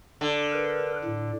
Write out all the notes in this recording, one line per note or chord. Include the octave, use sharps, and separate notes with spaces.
D3
A#4 B4
A2